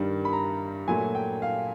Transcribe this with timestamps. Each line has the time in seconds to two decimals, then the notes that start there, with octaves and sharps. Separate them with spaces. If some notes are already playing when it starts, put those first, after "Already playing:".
Already playing: G2 D#3 G3
0.25 B5
0.33 A#5
0.87 A#2 F#3 A3 G#5
1.15 G5
1.42 F5